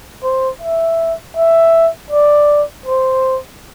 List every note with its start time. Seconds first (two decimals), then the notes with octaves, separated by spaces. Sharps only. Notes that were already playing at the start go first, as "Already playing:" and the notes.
0.23 C5
0.61 E5
1.37 E5
2.11 D5
2.86 C5